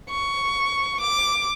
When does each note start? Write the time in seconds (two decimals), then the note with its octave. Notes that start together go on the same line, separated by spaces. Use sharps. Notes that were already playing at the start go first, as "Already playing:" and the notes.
0.10 C#6
1.00 D6